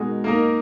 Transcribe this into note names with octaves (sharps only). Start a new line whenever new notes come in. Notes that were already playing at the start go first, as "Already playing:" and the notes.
Already playing: B2 G#3 D#4 F#4 A#4
A#3 D#4 A#4